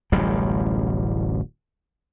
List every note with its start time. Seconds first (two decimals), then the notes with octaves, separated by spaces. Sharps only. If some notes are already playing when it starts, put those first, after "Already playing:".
0.12 D1 A1 F#2 G3